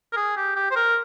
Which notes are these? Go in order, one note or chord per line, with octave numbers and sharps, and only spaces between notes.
A#4
G#4
G4
G4
C5
A#4